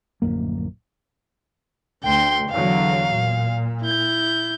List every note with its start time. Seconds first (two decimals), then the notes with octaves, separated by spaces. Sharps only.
0.22 D1 A#1 F#2 A#3
2.04 D2 G5 C6
2.50 E2 D3 F#3 F5
3.10 A#2
3.82 E4 G6